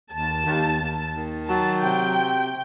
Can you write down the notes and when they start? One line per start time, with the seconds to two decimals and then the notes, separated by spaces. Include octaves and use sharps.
0.11 D#2 A5
0.45 D#2
0.81 D#2
1.14 D#3
1.48 F#3 A5
1.81 C3 G5